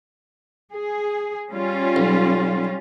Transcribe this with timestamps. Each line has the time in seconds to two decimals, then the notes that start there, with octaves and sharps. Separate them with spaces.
0.73 G#4
1.50 G3 C#4 F4
1.96 B1